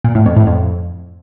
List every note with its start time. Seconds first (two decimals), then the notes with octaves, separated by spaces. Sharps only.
0.04 A#2
0.15 A2
0.26 F2
0.36 A2
0.47 F2